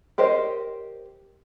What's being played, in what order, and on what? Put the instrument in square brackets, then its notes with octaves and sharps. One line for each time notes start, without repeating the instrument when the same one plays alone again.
[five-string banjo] G4 A#4 C5 C#5 D#5